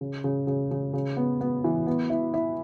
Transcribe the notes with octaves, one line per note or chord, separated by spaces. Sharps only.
C#3
C#3
C#3
C#3
C#3
B3
B3
E3
B3
E4
E4